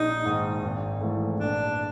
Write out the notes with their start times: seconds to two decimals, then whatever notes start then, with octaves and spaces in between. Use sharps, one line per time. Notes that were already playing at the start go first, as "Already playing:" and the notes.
Already playing: A#1 D#4
0.25 G#2 D#3
0.63 G#1
1.01 G#2 E3 A3
1.39 A#1 D4